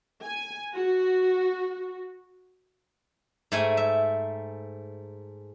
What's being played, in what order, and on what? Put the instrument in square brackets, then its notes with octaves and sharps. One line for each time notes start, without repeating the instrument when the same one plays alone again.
[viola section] G#5
F#4
[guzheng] G#2 A3 G#5
E5